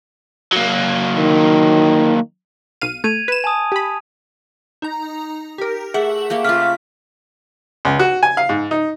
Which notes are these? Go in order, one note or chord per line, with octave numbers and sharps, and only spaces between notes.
F#3 A#3
D#3
B1 F5 D#7
A3 G#6 D#7 F7
B4 E7
G#5 A5 D#6
G4 B5
D#4 A#5
G4 A#4
A3 G#4 E5 F#5 F#7
A3 A#3 G4
C#3 F4 F6 B6
C#2
F#4
G#5
F5
G#2
D#4